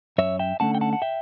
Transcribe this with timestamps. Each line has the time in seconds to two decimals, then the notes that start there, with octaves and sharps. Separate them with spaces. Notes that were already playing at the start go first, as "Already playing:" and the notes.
0.18 F#2 C#5 E5
0.39 E5 G5
0.60 D3 A3 C#4 F#5 A5
0.75 G5
0.81 F#5 A5
0.93 F#5
1.02 E5 G5